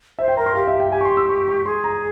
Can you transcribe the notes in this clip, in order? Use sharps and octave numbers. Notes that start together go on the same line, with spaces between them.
C5 E5
G5
A#4 A#5
C6
G4 F5
E5
G5
G4 G#5
C#6
C6
E6
C#6
C#6
G#4 C6
A#5